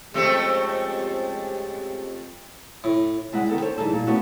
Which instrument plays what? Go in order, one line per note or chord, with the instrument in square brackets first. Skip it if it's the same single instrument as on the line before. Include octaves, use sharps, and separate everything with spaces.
[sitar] F2 A3 C4 [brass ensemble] G#3 C#4 G4
[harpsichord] A2
[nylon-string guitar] G3 G#3 E4 D#5 F#5
D#3 B3 A4 G5
G4 A4 C5 C#5
E3 F3 G3 D#4 G#4 A4
A#2 G3
A3 B3 C#4 E4 F#4